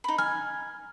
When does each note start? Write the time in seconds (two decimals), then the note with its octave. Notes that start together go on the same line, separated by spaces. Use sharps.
0.04 D#4 B5
0.18 G#5 F6